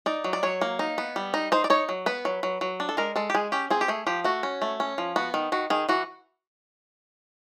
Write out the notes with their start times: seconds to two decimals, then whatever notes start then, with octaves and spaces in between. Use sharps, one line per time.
0.06 D#4 D5
0.24 F#3
0.33 D5
0.43 F#3 C#5
0.61 A#3
0.79 D#4
0.98 B3
1.16 G3
1.34 D#4
1.52 D#4 C5
1.64 D5
1.70 D#4 C#5
1.89 F#3
2.06 B3 B4
2.25 F#3
2.43 F#3
2.61 F#3
2.80 D4
2.89 A4
2.97 G#3 A#4
3.16 G#3 A4
3.30 G4
3.35 G#3 G#4
3.52 C#4 G4
3.70 C4 G#4
3.81 G4
3.88 A3 G#4
4.07 F3 G4
4.24 A3 F#4
4.43 C#4
4.62 A3
4.80 C#4
4.98 F3
5.16 B3 F#4
5.34 D#3
5.52 D#3 F#4
5.70 D#3 G#4
5.89 E3 F#4